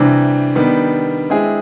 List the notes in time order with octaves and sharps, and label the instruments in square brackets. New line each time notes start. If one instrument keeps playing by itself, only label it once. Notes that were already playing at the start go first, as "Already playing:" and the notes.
Already playing: [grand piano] C3 E3 G3 C4 [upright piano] D4
[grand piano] D#3 G3 B3
G#3 C4 E4 G#4